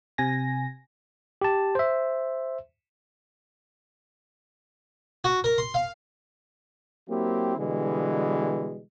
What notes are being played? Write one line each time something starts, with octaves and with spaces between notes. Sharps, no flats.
C3 G#5 A#6
G4 A5
C5 E5
F#4
A#4
C6
F5
F#3 A#3 C4 E4 G4
B2 D3 E3 G3 G#3